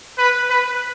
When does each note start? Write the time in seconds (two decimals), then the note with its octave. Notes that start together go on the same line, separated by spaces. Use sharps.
0.18 B4
0.50 B4